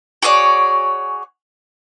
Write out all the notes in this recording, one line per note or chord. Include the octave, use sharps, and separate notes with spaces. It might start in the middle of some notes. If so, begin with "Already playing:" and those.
F#4 G#4 C#5 D5